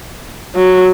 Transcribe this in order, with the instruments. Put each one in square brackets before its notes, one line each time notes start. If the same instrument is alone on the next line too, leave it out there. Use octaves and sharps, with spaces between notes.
[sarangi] F#3